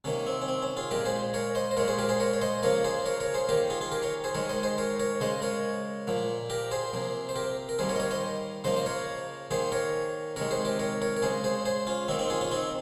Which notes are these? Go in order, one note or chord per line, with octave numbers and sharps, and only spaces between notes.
C3 D#3 A#3 C#4
C4
C#4
C4
C#4
F4 G#4
A#2 G#3 G4 A#4
G#4 C5
A#4 C#5
C5 D#5
C5
A#2 G#3 A#4 C#5
G#4 C5
G4 A#4
G#4 C5
A#4 C#5
C#5
C5 D#5
C#3 F3 A#3 A#4 C#5
G#4 C5
A#4 C#5
A#4 C#5
G#4 C5
D#3 A#3 G4 A#4
F4 G#4
F4 G#4
G4 A#4
A#4 C#5
G#4 C5
D#3 G#3 A#4 C#5
C5 D#5
G#4 C5
A#4 C#5
A#4 C#5
C#3 G#3 C5 D#5
A#4 C#5
A#2 F3 A#3
G4 A#4
G#4 C5
C3 F3 A#3
C5
G4 A#4
A#4
D#3 G3 A#3 G#4 C5
A#4 C#5
D#5
A#4 C#5
C5 D#5
C#3 F3 A#3 C5 D#5
C5
A#4 C#5
D#3 A#3 G#4 C5
A#4 C#5
C3 D#3 G#3 A#4 C#5
G#4 C5
G4 A#4
A#4 C#5
A#4 C#5
A#4
C#3 G#3 G#4 C5
G#4 C5
G#4 C5
C#4 F4
D#3 A#3 C4 D#4
C4 D#4
F4 G#4
C#4 F4
C4 D#4